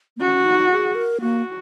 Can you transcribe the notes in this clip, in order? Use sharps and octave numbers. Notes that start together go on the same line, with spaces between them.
A#3
C#4 F#4
D#4
G#4
A#4
A#3 F#4